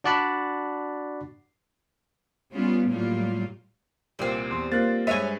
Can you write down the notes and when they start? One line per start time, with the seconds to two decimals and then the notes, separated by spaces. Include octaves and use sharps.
0.04 D4 F#4 D5 F#5 A5 B5
2.52 G3 B3 C#4 F4
2.88 A2 F#3 G3 A#3 F4
4.19 C2 A#2 G3 A#3 C4
4.51 E2 C6
4.72 A#3 F4 C5 F#6 A6
5.07 G2 G#3 C#5 E5 F5 G#5 D#7